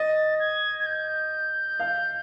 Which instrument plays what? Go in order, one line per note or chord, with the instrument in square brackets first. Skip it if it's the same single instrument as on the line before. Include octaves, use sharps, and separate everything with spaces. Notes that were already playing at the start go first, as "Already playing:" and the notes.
Already playing: [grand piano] D#5 [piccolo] A6
[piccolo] G#6
G#6
G6
[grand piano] F5